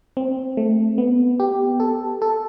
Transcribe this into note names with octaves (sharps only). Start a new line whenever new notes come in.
C4
A3
B3
G4
A4
A4